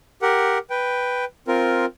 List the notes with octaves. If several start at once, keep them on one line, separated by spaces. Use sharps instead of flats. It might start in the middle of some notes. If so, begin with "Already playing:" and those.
G4 A#4 F#5
B4 G5
C4 F4 A#4